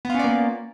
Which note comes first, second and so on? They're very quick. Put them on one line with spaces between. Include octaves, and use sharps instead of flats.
B3 F4 C#4 D5 A#3